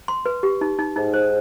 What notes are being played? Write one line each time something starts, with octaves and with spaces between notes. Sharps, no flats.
C6
B4
G4
D#4
D#4
G#2 D#4
C5